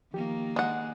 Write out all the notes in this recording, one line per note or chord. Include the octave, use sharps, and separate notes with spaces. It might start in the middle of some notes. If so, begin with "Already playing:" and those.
D#3 F3 A#3 G4
G#3 F#5